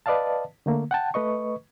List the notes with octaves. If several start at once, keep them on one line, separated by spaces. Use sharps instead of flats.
B4 D5 D#5 F5 A5
D3 A3 A#3
F#5 G5 A5
A3 B4 D#5 C#6